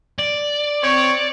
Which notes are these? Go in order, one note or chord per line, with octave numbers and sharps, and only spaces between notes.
D5
C4 C#5